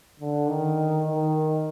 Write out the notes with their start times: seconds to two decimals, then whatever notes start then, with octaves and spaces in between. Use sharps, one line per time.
0.19 D3
0.48 D#3
1.05 D#3